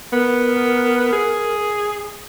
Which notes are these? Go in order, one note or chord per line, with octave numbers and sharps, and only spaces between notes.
B3 A#4
G#4